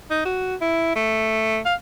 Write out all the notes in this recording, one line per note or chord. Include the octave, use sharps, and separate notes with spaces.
D#4
F#4
E4
A3
F5